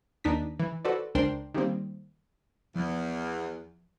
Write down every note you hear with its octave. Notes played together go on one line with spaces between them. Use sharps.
D#2 D4 D#4 B6
E3
F#4 A4 B4 C5 D5
C#2 D4 A#4 C5 G5 C6
D#3 G3 A#3 C4
E2 F3